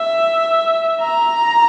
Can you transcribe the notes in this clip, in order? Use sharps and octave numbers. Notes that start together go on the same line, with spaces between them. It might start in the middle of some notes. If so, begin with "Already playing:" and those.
Already playing: E5
A#5